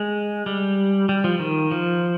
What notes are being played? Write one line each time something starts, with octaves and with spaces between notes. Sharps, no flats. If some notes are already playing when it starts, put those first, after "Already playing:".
Already playing: G#3
G3
G3
F3
D#3
F3